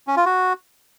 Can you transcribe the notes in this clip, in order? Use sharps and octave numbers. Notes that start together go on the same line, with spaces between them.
C#4
F4
F#4